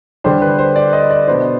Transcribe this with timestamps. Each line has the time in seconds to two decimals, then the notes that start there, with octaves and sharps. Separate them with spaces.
0.24 D3 G3 D4 C5
0.42 B4
0.59 C5
0.76 D5
0.93 D#5
1.11 D5
1.27 B2 B3 D4 C5